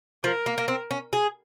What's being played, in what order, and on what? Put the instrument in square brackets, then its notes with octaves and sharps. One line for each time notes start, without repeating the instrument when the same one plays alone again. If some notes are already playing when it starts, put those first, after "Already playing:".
[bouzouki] F3 [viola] A#4
[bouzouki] A#3
A#3
C4
C#4
G#4